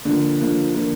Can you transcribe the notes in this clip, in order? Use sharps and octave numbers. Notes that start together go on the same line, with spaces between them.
D3 F3 A#3
D3 F3 A#3
D3 F3 A#3